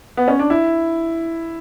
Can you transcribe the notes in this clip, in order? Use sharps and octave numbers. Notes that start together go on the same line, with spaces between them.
B3
C#4
D4
E4